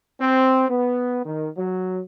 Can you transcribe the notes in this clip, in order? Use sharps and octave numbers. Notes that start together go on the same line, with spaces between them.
C4
B3
D#3
F#3